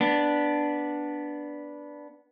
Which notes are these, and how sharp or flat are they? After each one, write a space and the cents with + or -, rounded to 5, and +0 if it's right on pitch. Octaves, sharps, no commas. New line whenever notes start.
B3 -5 D4 +0